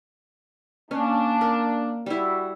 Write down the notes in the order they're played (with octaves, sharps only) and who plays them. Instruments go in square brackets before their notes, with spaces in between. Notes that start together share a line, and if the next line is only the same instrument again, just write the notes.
[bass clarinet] A#3 [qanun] C#4 [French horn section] D4
[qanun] A#4
[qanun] G3 E4 [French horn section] F#4